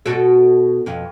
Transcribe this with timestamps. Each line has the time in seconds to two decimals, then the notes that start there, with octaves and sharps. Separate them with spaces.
0.06 B2 F#4 A4
0.86 F2 B2